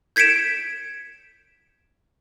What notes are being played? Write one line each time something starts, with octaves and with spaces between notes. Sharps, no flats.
G6 G#6 B6 C#7 D7 E7